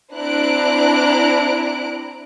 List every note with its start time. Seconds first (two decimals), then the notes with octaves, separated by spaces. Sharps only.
0.15 C4 D4 E4 A#5 F#6 D7